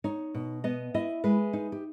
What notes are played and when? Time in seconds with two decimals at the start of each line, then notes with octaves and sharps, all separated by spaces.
0.04 D#4 C#5
0.34 B2
0.64 B3 D#5
0.94 E4 D#5
1.24 G#3 B4
1.53 D#4
1.72 G4